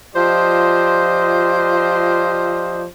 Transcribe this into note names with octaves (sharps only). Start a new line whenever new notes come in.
F3 F4 G4 C5 D5 D#5